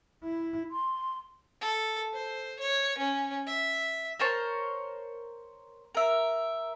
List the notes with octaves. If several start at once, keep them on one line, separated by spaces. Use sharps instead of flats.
E4
C6
A4
C5
C#5
C#4
E5
A#4 C5 C#5 A5
A#4 E5